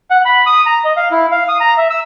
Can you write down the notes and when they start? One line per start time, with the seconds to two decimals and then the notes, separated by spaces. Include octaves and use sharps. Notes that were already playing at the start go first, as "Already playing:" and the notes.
0.10 F#5
0.25 B5
0.46 D#6
0.66 A#5
0.85 D#5
0.97 F5
1.11 E4
1.31 F5
1.48 D#6
1.60 A#5
1.78 E5
1.90 E6